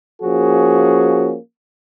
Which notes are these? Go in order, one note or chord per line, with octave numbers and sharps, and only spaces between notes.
F3 A#3 C#4 F#4 G#4